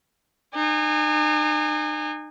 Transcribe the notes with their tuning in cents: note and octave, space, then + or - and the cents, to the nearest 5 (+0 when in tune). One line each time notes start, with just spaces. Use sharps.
D#4 -40 G#5 -20